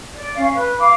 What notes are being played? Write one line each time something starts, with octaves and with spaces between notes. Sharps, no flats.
D5
C#4 F5
B4
F5 D6